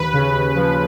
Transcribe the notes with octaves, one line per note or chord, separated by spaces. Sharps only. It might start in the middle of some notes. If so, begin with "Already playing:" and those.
Already playing: D#2 B4
C#3
D#2
F3